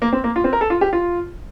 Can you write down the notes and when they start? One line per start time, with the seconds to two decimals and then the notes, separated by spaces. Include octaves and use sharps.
0.02 A#3
0.13 C4
0.24 A#3
0.36 F4
0.44 C4
0.53 A#4
0.61 A4
0.70 F4
0.81 G4
0.93 F4